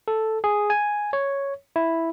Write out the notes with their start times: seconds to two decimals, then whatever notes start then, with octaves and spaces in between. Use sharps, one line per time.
0.08 A4
0.44 G#4
0.70 G#5
1.13 C#5
1.76 E4